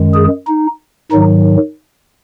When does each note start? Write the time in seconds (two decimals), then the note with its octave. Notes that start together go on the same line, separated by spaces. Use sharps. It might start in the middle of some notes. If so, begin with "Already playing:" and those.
Already playing: F#2 D#3 G#3
0.14 G#4
0.47 D#4
1.12 G#2 D#3 F#3 D#4